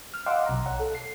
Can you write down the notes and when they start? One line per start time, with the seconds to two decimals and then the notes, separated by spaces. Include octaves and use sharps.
0.14 F6
0.26 D#5 F5 F#5 C6 D6 E6
0.46 B1 A#5
0.66 C#5 F#5
0.80 A4
0.95 C7